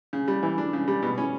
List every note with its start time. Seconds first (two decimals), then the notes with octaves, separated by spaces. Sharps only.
0.13 C#3
0.28 G3
0.43 E3
0.58 D4
0.73 C#3
0.88 G3
1.02 B2
1.18 C#4